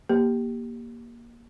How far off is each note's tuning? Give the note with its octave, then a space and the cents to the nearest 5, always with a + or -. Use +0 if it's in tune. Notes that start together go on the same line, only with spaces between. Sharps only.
A#3 +20 G4 +0